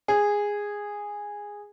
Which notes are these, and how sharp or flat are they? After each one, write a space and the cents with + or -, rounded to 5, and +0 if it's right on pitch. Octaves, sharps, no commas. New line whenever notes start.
G#4 -10